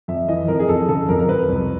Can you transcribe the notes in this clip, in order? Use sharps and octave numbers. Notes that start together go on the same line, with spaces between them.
F2 E5
E3 D#5
F2 A#4
G#4
F2 A4
C#3 A4
F2 A#4
A#4
F2 B4
C2